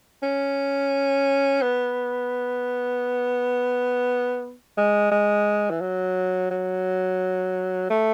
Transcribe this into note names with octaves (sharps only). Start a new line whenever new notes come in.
C#4
B3
G#3
G#3
E3
F#3
F#3
A3